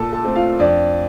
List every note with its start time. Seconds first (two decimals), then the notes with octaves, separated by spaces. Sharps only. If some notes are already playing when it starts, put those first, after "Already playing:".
Already playing: A#2 A4 A5
0.12 A4 A5
0.24 A3 C4
0.36 F4 F5
0.59 F2 D4 D5